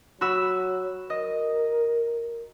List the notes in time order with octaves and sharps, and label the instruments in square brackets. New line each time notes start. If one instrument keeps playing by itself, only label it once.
[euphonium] F#3 [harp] F#4 B5 E6
[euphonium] A#4 [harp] D#5